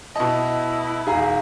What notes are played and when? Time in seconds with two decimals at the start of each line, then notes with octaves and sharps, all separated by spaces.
0.16 B2 E4 D#5 A5
1.07 E1 D#4 G#4 F5 A#5